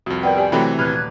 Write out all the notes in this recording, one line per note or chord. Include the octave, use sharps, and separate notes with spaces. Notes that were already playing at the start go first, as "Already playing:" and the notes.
C2 F2 F#4
B3 A#4 D5 F#5 G5
G4 D5 G#5
C3 E3 F#3 A3 F#4 G4 A4 B5
D#1 B4 F6 F#6 G#6